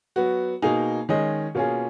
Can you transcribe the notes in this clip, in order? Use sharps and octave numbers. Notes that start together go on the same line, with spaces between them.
F#3 B3 F#4
B2 A#3 D#4 G#4
D#3 G#3 C#4 G#4 D#5
B2 A#3 C#4 F4 G#4